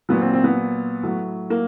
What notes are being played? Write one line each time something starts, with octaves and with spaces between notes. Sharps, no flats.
A#2 F#3 B3
C4
C4
B3
A2 F#3
A#3